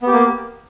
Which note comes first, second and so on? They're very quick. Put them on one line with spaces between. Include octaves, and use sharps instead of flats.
B3 G4 A#3